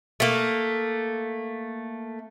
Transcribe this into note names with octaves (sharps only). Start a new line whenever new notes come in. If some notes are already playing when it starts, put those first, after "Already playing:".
A3 A#3